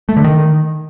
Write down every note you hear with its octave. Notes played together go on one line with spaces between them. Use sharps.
A3
D3
D#3